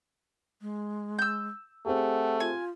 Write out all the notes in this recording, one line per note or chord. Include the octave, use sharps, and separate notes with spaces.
G#3
E6 G6
A3 C4 G4 G#4 F#5
F4 G#5